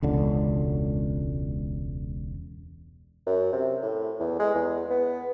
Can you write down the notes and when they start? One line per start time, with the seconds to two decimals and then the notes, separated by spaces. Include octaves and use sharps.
0.03 E1 C#2 D3
3.26 F#2
3.52 C3
3.83 A2
4.20 E2
4.39 G#3
4.55 E2
4.90 B3